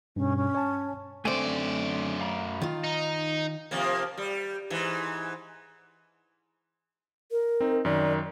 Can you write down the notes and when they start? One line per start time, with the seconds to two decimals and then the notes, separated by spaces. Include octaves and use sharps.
0.16 G2 B2 C#4
0.36 C#4
0.55 C#5 G#5 A5
1.25 F#2 D3 A3 C4 C5 D5 G#5
2.21 F5 A#5 B5
2.62 D#3 F4
2.84 D#4
3.71 C3 F3 A#3
4.18 G3
4.70 G#2 E3
7.32 A#4
7.60 C4 D#4
7.85 F#2 D#3 D5